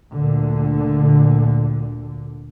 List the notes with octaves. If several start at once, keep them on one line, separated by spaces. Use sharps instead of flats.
D2 A#2 D3